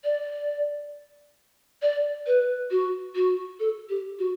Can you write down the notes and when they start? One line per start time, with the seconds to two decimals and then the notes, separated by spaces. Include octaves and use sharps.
0.04 D5
1.82 D5
2.27 B4
2.71 F#4
3.16 F#4
3.60 A4
3.89 G4
4.19 F#4